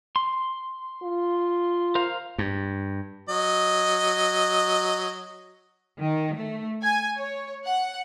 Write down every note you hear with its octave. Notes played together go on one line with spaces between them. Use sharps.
C6
F4
A#4 C5 F5
G2
F#3 D#5
D#3
A3
G#5
C#5
F#5